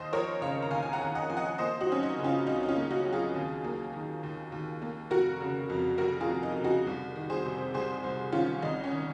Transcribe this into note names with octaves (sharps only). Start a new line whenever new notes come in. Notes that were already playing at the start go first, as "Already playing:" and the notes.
Already playing: D#2 C5 D#5
F3 A#4 C#5
C#3 C#5 F5
A#5
D#2 F5 G#5
G#5
F#5 A#5
D#2
D#5 F#5
F3 G#5
D#5 F#5
A#3 C5 D#5
D#4 F#4
F#3 C#4
D#4
C#3
C#4 F4
C#2 D#4
D#4
C#4 F4
A#3
D#4 F#4
F#3
F4 G#4
D#2
A#3
D#3
D#2
D#2
A#3
F1 F#4 A#4
C#3
F2
F1 F#4 A#4
F4 G#4
F1
D#4
C#3
D#4 F#4
C2
D#3
G#4 C5
C3
C2 G#4 C5
C2
D#3 C#4 F4
G#1 D#4
C#4
D#3